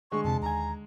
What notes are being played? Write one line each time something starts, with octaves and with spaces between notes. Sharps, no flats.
D3 G#3 C#6
F2 C3 A5
D#2 G#5 A#5